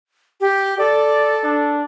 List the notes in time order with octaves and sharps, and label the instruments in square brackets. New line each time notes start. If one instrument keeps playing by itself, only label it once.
[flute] G4
[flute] A4 [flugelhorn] D5
[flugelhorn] D4